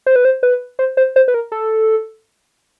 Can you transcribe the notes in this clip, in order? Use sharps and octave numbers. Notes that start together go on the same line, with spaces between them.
C5
B4
C5
B4
C5
C5
C5
B4
A#4
A4